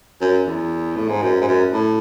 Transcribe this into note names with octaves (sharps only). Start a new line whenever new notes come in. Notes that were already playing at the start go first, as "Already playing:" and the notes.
F#2
E2
A2
G#2
F#2
G#2
F#2
A2